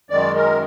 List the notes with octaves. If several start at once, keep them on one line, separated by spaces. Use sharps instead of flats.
F#2 D#3 G#3 D5
A#4